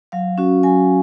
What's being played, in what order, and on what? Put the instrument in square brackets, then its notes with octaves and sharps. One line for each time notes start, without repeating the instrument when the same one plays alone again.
[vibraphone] F#3 F5
C#4 F#4
F#3 G#5